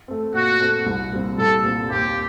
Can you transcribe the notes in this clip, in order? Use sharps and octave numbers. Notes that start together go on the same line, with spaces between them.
A3 C4
A#2 F#4
A3 C4
C2
A#2 G3 C4
C2 A4
A#2 G3 C4
D#2 G4